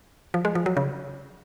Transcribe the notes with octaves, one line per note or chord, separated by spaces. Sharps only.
F3
G#3
F3
F#3
C#3